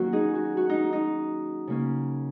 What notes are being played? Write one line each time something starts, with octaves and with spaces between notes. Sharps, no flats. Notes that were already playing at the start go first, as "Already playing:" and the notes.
Already playing: D#3 F#3 A#3 C#4 F#4
D#4 G#4
F#4
F#4
D#4
D#4
C#3 A#3 C#4